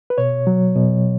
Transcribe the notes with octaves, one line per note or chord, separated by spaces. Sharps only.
B4
B2 C#5
F#3
B2